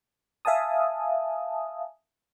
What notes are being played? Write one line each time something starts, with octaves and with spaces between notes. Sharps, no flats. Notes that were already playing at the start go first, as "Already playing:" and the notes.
E5 F5 G#5 A5 D#6